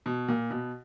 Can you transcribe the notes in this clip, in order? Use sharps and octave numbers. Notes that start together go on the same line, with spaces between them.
B2
A#2
B2